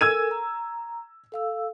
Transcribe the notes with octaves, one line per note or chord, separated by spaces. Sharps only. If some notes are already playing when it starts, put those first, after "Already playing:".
A4 A#4 G#5 E6 G#6 D#7
A#5
A4 F5 E6